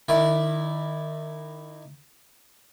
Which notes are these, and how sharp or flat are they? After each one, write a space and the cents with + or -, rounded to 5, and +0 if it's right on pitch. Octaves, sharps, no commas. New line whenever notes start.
D#3 -25 E4 +0 D5 +0